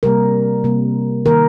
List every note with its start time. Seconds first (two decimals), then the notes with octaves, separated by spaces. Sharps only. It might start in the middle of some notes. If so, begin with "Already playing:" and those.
0.03 C3 G3 A#3 A#4
0.64 C3 G3 A#3
1.26 D#3 A#3 A#4